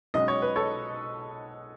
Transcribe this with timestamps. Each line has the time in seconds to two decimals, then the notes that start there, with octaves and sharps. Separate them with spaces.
0.14 B1 B2 G#3 C#4 D#5
0.28 C#5
0.42 B4
0.56 A4 C#5